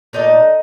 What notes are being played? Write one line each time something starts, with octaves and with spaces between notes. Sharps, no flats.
A#2 A3 D4 D#4 D#5